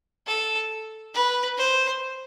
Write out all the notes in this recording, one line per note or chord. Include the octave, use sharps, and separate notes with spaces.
A4
B4
C5